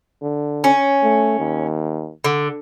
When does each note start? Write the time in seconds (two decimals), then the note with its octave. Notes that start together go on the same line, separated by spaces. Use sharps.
0.22 D3
0.64 C#4
1.03 A3
1.39 D#2
2.24 D3